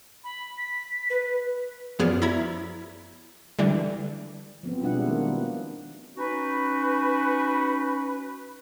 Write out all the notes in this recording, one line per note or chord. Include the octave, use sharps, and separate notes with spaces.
B5
B6
B4
F#2 F3 B3 G#4 D5 F6
E4 A#5 B5 G#6
D3 E3 G3
F3 B3 C4
B2 G3 G#3 D4 E4 F#5
D#3 A#3
C#4 D#4 F#4 B4